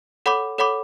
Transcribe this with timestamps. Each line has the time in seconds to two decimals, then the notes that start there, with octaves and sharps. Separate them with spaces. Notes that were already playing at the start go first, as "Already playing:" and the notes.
0.26 A4 C#5 F#5 B5 D6
0.58 A4 C#5 F#5 B5 D6